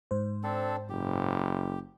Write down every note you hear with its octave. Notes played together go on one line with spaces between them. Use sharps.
G#2 C5
C4 D4 A4
F#1 G4